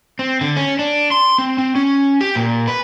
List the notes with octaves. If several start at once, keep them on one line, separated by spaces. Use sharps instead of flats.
C4
D3
C#4
D4
C6
C4
C4
C#4
G4
A#2
B4